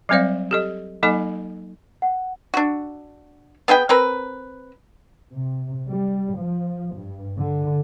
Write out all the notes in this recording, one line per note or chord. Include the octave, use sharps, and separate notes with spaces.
F#3 G3 C4 C5 D5 F5
G4 A4 D#5
F#3 A#3 D#4 A4 D#5 G#5
F#5
D4 F#4
B3 G#4 B4 G5
C4 A#4 B4
C3
G3
F3
G2
D3